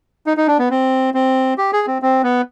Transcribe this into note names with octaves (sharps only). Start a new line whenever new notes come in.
D#4
D#4
D4
B3
C4
C4
G4
G#4
C4
C4
B3